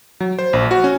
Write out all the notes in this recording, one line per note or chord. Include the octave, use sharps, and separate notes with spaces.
F#3
C5
A#1
F#4
C#4